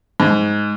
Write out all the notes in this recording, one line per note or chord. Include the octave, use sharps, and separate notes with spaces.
G#2